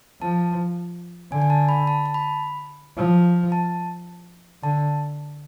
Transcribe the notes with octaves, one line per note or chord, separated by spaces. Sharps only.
F3 A5
D3 G#5
G#5
A5
B5
A5
A5
B5
F3
A5
D3 A5